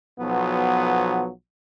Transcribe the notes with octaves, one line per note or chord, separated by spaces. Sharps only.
B1 F3 F#3 B3